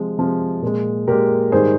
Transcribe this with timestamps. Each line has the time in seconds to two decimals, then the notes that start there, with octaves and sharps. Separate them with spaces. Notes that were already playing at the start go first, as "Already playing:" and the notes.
Already playing: C3 F3 G#3
0.18 C3 F3 G#3
0.62 A#2 G#3
1.08 A#2 G#3 G4 A#4
1.52 G#2 D#3 G3 G#4 C5